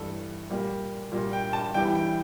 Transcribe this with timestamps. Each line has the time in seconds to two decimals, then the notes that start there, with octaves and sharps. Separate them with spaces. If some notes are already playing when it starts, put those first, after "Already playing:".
Already playing: G2 E3 A3 A4
0.50 A#2 G3 A#3
1.12 A#2 G3 A#3
1.33 G5
1.53 A5
1.74 E2 E3 G3 G5
1.95 G5